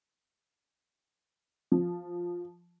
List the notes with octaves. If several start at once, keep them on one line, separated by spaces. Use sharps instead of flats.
F3